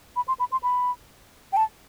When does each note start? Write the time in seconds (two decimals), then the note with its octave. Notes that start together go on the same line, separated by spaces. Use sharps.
0.16 B5
0.28 C6
0.40 B5
0.52 C6
0.63 B5
1.53 G5
1.57 A5